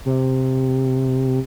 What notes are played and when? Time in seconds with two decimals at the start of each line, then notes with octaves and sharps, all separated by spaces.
0.06 C3